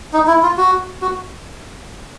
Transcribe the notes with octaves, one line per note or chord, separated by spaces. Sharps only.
D#4
E4
F4
F#4
F#4